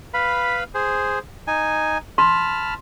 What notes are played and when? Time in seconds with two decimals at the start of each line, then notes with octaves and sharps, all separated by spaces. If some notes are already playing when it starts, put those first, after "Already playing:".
0.14 B4 F5 B5
0.74 G#4 C5
1.47 D#4 G#5
2.18 A5 B5 C6 F6